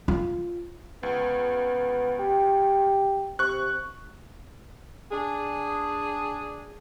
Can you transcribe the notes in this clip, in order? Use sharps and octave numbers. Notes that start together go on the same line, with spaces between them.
F4
C#2 B3
G4
C3 C#6 F#6
D4 G#4